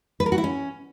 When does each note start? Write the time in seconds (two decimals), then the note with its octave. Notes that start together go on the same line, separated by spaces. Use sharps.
0.20 B4
0.26 A#4
0.32 F#4
0.38 E4
0.44 C#4